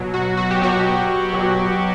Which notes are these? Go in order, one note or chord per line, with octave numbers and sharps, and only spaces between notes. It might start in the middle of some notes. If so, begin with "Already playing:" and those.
Already playing: B2 F#3
F#4
F#4
G4
B2 F#3 F#4
B2 F#3